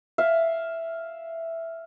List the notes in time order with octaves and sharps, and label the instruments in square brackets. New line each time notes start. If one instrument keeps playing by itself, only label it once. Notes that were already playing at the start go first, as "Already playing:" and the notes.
[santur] E5 F5